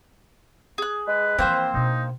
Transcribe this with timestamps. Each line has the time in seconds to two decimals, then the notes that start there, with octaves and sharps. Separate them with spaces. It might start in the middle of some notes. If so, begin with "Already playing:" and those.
0.78 G#4 F#6
1.08 G#3 B4
1.39 E3 F3 A#3 C4 C5 G5
1.74 B2 D4 D#4